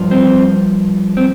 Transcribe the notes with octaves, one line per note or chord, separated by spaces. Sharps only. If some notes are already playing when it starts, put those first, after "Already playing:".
Already playing: G2 F3
C4
C4